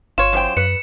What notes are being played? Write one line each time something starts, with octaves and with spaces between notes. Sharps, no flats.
G1 F4 C#5 E7
F#2 C5 G5
F#2 B4 C#7